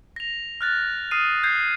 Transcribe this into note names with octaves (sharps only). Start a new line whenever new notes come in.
A#6 F7
F6 F#6 A6
D#6 F6 C7 D#7
G6 G#6 C7